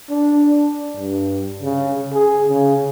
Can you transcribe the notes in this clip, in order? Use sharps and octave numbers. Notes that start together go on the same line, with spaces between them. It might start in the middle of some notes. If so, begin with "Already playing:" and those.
D4
G2
C#3
G#4
C#3